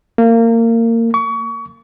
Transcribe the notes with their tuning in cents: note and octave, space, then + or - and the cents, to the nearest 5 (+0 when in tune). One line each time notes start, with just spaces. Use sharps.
A#3 -25
C#6 +30